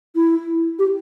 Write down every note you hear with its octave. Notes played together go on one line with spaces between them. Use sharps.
E4
G4